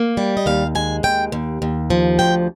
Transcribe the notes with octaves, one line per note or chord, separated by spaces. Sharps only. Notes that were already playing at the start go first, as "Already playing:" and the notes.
Already playing: A#3
G3
D#5
D#2 F5
G#3 G#5
D#2 G5
D#2
D#2
F3
D2 G5